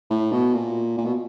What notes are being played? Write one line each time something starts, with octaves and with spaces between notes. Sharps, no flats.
A2
B2
A#2
A#2
B2